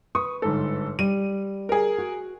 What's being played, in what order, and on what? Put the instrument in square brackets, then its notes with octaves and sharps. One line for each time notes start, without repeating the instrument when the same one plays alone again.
[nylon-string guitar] B4 [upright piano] C#6 D#6
[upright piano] G1 G#2 A4
[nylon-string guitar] G3 [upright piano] D#7
[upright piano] G#4 A#4
[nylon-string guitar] F#4